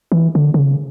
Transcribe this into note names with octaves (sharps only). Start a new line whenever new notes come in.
E3
D3
D3
C#3